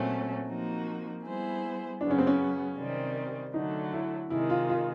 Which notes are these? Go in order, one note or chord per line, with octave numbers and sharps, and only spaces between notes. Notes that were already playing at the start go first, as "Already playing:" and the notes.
Already playing: A#2 F#3 A3 C4 C#4
F3 A#3 D#4 F#4
G3 B3 E4 G#4 C5
F#2 C#3 F#3 B3 D4
C#4
C4
C#4
C3 D#3 G3 C4
D3 F#3 A3 D#4
E4
C3 D#3 G#3 E4
F4
F4